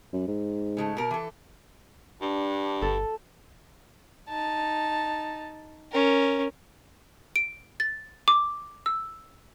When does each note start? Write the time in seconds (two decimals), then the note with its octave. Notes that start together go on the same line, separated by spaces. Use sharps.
0.13 F#2
0.28 G#2
0.77 C#3 G#3 A3
0.97 B2 A#4
1.11 E3 A4
2.22 G2 D4
2.82 G1 A4
4.29 D#4 A5
5.91 C#4 A#4
7.36 D7
7.80 A6
8.28 D6
8.86 E6